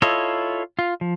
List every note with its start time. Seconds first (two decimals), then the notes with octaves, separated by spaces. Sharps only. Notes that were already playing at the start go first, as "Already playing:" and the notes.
0.02 E4 F4 A4 C#5 D#5
0.79 F4
1.01 F3